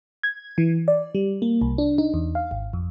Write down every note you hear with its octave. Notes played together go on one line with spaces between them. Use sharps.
G#6
E3
D5
G3
A#3
C2
D4
D#4
E2
F5
G#1
F2